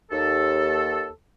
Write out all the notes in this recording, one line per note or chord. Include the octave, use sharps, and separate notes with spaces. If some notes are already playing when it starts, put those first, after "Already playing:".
D#2 A4